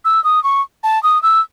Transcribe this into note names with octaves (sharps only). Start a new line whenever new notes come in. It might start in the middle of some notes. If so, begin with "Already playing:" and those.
E6
D#6
C#6
A5
D#6
E6